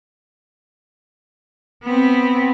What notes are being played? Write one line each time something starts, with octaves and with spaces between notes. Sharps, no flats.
B3 C4